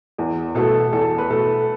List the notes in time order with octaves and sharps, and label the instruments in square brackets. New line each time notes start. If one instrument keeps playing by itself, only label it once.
[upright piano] E2
[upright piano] B2 A3 [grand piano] A4
[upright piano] E2 [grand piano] A4
[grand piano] B4
[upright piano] B2 A3 [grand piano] A4